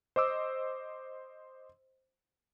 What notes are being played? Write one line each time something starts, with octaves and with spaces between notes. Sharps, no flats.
C5 D#5 D6 E6